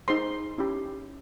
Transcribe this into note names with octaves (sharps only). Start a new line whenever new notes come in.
D#4 G#4 C5 C6
C#4 E4 G4